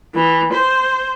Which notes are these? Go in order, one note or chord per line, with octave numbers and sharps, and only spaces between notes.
E3
C5